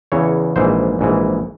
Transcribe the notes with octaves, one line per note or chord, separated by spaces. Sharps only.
E2 C#3 E3 C#5
A#1 G#2 E3 C5
A#1 G#2 E3